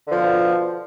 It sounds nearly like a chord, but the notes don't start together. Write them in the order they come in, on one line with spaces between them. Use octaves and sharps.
D3 F3 B2